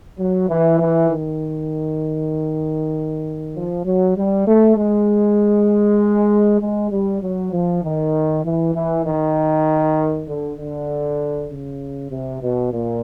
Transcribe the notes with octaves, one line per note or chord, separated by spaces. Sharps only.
F#3
E3
E3
D#3
F3
F#3
G3
A3
G#3
G#3
G3
F#3
F3
D#3
E3
E3
D#3
D3
D3
C#3
C3
B2
A#2